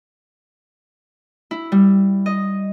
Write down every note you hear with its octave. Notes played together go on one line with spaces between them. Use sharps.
E4
G3
D#5